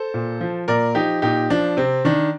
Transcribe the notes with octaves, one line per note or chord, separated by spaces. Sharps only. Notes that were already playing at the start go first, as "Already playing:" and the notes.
Already playing: A4 C5
A#2
F3
A#2 A#4 D5
F3 D#4 G4
A#2 D#4 G4
F3 D4
C3 C4
D#3 D4